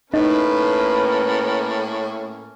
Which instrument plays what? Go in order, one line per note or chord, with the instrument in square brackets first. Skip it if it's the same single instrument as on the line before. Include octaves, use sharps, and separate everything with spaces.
[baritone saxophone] A2 [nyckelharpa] A#3 C#4 [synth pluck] D#4 [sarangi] B4